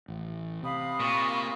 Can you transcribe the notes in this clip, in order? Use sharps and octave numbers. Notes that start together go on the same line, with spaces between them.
A1
C3 F5 B5 D#6
A#2 C#6